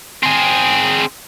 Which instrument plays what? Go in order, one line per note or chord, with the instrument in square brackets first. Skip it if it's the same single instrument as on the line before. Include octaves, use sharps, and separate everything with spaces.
[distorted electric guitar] C4 G#4